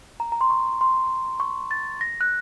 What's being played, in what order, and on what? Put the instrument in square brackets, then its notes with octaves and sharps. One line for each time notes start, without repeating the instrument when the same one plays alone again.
[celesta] A#5
A#5
C6
C#6
C6
C#6
A6
A#6
F#6